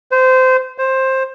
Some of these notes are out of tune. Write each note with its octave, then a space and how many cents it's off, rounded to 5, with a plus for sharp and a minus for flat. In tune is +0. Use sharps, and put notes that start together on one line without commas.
C5 -20
C5 +15